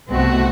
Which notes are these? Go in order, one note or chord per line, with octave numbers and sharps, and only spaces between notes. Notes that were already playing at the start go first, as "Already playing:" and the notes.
C2 B2 A3 C4 F#4